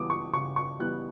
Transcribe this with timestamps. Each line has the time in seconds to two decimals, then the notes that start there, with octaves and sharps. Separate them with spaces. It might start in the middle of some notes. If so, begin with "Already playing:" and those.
Already playing: C#3 E3 G3 B3 D6 D#6
0.10 C#6
0.33 C#3 C#6
0.56 C#6
0.79 E3 G3 B3 F#6